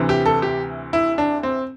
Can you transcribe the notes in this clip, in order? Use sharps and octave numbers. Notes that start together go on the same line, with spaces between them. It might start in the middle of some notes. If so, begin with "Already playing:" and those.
Already playing: D2 C3 E3
G4
A4
G4
E4
D4
C4